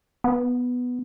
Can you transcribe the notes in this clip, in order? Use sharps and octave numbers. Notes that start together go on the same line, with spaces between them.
B3